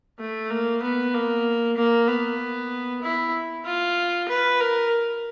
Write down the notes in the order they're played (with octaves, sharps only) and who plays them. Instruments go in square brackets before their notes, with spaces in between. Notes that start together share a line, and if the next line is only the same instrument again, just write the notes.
[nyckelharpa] A3
A#3
B3
A#3
A#3
B3
E4
F4
B4
A#4